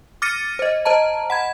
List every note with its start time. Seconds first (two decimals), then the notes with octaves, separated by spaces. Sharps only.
0.22 D6 F6 A6 A#6 C#7 D#7
0.59 C5 D#5
0.85 C5 D#5 A5 A#5
1.30 F#5 B5 G#6